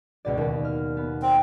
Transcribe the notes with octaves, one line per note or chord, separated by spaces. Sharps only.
C#2 B2 D5
D#2
F6
B3
C4